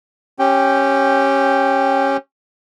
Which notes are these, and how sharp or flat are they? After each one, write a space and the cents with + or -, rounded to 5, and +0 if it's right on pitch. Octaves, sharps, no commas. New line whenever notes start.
C#4 -15 G4 +0 G5 +0